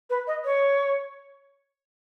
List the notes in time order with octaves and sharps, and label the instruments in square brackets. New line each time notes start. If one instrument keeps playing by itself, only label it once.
[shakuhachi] B4
D#5
C#5